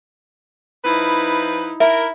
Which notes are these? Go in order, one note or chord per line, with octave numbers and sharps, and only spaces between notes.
F3 D#4 E4 B4
E4 A#4 E5